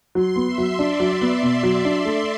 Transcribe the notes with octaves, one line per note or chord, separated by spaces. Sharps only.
F#3 C6
B3
E5
F#3
D4 D5
F#3
B3
B2
F#3
D4
A3